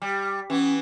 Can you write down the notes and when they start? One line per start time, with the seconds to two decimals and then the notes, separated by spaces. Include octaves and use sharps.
0.02 G3
0.50 E3 B3 C#4